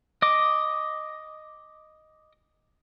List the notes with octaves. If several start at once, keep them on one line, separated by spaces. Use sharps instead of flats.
D#5 D6